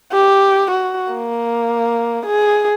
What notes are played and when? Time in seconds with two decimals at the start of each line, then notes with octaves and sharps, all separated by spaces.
0.12 G4
0.71 F#4
1.13 A#3
2.26 G#4